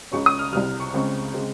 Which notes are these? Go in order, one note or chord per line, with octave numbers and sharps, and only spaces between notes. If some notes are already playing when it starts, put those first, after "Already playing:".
C#2 C#3 G#3 C#4 C#6
D#6
F6
C2 C3 G3 F6
C#6
C#2 C#3 G#3 C4
C#3 G#3 C4